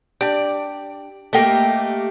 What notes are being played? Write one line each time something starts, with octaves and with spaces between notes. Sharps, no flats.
D4 G4 D5
A3 A#3 G4 A4 D#5 G5